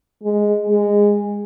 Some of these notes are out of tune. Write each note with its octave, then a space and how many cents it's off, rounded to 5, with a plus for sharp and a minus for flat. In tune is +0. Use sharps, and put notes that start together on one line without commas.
G#3 +0
G#3 -15